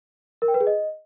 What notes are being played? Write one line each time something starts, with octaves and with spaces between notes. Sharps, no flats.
A#4
G5
B4
G#4
D#5